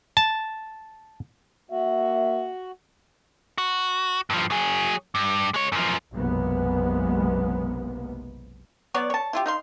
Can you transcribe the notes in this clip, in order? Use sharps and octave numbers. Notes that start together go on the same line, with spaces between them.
A5
A#3 F#4 E5
F#4
G2 F3
F#3 G#4
G2
G#3 C#5
F#2 F3
F#1 B1 C3 G#3 A#3 B3
F#3 B3 C#5 D5
C#5 A5
E4 F4 G4
D#4 F5 C6